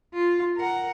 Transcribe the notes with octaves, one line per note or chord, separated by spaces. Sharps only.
F4
A#4 F#5